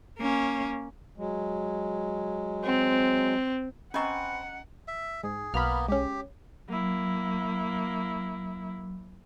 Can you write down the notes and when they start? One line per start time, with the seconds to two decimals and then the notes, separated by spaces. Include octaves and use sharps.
0.19 A#3 C#4
1.18 F#3 G#3
2.64 C4
3.94 C4 C#4 B4 D#5 F#5 G#5 A#5 C#6
4.88 E5
5.24 G#2 G#4
5.54 B1 A#3 B3 B5 F6
5.88 G#3 C#4 G4
6.68 F#3 A#3 E4